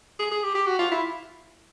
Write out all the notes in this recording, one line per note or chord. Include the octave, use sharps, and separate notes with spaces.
G#4
G#4
G4
G4
F#4
F4
E4